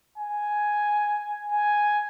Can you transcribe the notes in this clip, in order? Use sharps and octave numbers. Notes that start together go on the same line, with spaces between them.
G#5
G#5